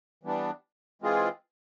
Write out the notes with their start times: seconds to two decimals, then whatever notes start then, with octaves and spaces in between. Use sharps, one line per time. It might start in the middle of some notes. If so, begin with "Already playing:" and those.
0.23 E3 G3 B3 D4
1.02 E3 G#3 C4 F4 G#4